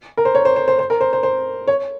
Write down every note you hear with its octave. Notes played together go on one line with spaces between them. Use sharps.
A#4
C5
C#5
C5
C5
C5
C5
A#4
C5
C5
C5
C#5